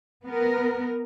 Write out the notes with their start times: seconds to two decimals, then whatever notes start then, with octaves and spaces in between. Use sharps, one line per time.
0.25 B3 A#4